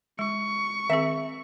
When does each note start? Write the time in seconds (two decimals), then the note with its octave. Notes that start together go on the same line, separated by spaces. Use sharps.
0.19 G#3 C#6
0.89 D#3 C4 G#4 E5